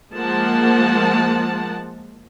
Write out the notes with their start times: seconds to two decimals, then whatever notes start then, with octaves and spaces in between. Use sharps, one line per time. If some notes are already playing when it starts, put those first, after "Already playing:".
0.15 F3 G#3 A#3 F#5 A5